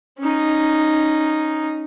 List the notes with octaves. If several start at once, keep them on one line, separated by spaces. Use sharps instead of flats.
C#4 D#4